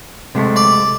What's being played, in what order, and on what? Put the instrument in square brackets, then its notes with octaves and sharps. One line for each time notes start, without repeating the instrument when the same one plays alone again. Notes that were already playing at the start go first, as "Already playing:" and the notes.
[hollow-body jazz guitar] C3 G#3 A3
[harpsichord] D5